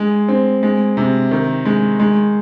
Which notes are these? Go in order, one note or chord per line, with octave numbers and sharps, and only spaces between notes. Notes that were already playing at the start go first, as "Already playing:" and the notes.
Already playing: G#3
C4
G#3
C3
D#3
G#3
G#3